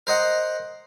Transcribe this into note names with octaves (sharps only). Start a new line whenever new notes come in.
A#4 C5 D#5 F#5